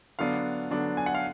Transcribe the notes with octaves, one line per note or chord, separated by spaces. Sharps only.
D3 F#3 B3 D4 F5
D3 F#3 B3 D4
G#5
F#5
F5